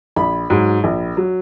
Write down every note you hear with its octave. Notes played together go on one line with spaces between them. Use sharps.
A#1 B5
G#2 F#3
A#1
F#3